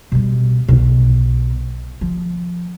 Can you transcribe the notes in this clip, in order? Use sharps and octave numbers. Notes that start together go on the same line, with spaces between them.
B2 G3
B1 B2
F3